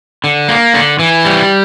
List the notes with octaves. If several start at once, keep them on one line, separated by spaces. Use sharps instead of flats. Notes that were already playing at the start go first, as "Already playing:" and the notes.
D3
A#3
D3
E3
G3